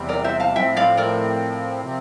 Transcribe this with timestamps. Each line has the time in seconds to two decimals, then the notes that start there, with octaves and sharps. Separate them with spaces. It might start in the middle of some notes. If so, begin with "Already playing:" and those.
Already playing: E2 C3 G3 C4
0.08 A#4 D5
0.24 C5 E5
0.40 F5 A5
0.55 A2 F3 C4 E5 G5
0.76 D5 F5
0.97 A#4 D5
1.82 C3 F3 C4